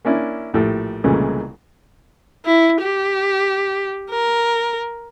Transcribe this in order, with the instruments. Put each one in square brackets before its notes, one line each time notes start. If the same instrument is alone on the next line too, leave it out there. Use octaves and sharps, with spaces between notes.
[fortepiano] A#3 C#4 D4 E4
A#1 A2 G4 A4
C2 A#2 C#3 E3 G#3 A3
[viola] E4
G4
A#4